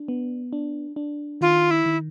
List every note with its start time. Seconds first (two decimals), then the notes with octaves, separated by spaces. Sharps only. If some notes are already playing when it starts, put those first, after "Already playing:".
Already playing: D4
0.08 B3
0.53 D4
0.96 D4
1.41 D#3 F4
1.71 E4
1.86 D#3